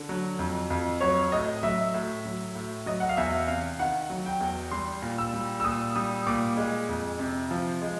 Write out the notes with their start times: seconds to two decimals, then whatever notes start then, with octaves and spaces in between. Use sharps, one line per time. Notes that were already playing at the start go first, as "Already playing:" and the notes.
Already playing: D3
0.09 F#3
0.39 F2
0.70 F2
1.01 F#3 C#5
1.32 A2 D#5
1.63 F#3 E5
1.94 A2
2.25 F#3
2.55 A2
2.86 F#3 D#5
3.00 F#5
3.09 F5
3.17 E2 E5
3.48 C3 F5
3.79 D#3 F#5
4.10 F#3
4.26 G5
4.41 E2
4.71 G3 C6
5.02 A#2
5.18 E6
5.34 G3
5.60 E6
5.64 A#2 D#6
5.96 G3 D#6
6.27 A#2 D6
6.57 G#3
6.89 F2
7.19 C3
7.51 F3
7.82 G#3